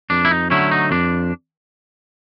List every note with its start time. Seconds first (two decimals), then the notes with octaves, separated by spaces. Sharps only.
0.10 F2 D4
0.25 E4
0.31 D#4
0.50 D3 F#3 A3 C#4 E4
0.71 D#4
0.91 F2 D4